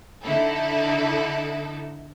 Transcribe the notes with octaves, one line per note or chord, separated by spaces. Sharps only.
D3 D#4 E4 A4